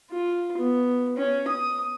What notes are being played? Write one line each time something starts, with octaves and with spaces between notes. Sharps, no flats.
F4
B3
C#4
D#6